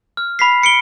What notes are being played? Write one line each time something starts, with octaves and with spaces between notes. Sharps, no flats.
F6
B5 B6 C7
B5 C#7 D7 G7